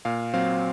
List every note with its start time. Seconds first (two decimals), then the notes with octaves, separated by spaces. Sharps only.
0.05 A#2 F5
0.34 F#3 C4 F5